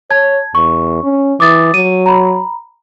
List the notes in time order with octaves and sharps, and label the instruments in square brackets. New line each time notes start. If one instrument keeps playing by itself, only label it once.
[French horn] C#5 [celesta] A5 G#6
[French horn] E2 [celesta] C#6
[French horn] C#4
[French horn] E3 [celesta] D6 D#6 A6
[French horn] F#3 [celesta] D#7
[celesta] A#5 B5